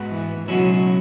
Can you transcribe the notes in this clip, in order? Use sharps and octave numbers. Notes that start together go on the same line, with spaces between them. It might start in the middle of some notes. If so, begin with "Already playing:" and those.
Already playing: G#2 G#3 B3 F#4 B4
E3
C#2 B2 F#3 G#3 C#4 E4